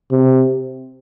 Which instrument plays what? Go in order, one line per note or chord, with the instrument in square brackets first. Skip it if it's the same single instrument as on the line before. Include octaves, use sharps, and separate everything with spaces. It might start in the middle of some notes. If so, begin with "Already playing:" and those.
[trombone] C3